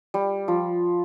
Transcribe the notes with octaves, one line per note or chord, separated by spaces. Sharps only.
G3
F3